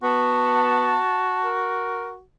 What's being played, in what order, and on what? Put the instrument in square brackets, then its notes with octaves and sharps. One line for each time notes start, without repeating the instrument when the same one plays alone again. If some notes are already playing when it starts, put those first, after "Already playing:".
[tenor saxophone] B3 [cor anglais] F#4 [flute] A5
[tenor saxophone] A#4